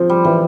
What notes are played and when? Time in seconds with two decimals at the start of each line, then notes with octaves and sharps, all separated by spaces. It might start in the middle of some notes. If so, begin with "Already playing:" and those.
Already playing: F3 C4
0.09 G3
0.25 E3 G3